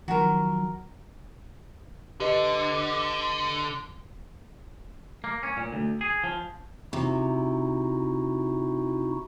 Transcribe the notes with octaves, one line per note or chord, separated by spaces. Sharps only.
D#3 F3 F#3 F#4 A#4
D3 G4 B4 D#5
A#3
C#4
A#2
D2
G#4
F3
C3 D#4 E4 F#4